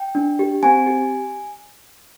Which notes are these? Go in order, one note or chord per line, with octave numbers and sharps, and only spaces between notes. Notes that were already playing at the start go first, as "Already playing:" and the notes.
Already playing: G5
D4
G4
C4 G#5
G4